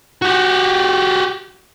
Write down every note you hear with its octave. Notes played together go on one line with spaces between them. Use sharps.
F#4 G4